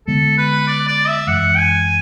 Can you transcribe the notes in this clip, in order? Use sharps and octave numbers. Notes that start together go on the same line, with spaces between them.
D3 G#3 B3 A4
B4
D5
D5
E5
F#2 E3 G#3 F#5
G#5